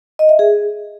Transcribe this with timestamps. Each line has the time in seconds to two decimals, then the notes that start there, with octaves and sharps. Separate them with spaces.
0.19 D#5
0.29 E5
0.39 G#4